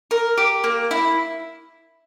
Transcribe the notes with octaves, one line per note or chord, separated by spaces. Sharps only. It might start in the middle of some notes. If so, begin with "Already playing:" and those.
A#4
G4
A#3
E4